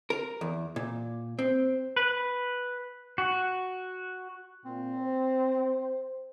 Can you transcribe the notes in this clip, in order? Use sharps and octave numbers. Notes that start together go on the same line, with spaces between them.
A#4
E2
A#2
C4
B4
F#4
A#2 C4
C5